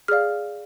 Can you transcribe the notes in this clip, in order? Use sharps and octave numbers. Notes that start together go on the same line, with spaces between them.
G#4 D5 F5 F6